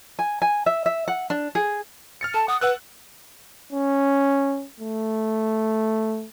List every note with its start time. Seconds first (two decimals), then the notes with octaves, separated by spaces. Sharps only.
0.19 G#5
0.42 G#5
0.66 E5
0.86 E5
1.08 F#5
1.30 D4
1.55 G#4
2.21 F6 A6 C#7
2.34 A4 A5
2.48 F#5 D#6
2.61 B4 F#5 E6 F#6
3.72 C#4
4.80 A3